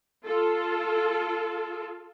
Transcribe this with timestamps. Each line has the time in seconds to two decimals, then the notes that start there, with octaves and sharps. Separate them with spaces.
0.24 F4 A4